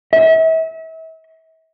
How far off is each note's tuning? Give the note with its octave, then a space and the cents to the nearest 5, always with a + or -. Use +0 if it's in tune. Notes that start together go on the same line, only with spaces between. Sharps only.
E5 -35